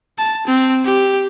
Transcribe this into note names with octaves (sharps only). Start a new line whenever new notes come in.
A5
C4
G4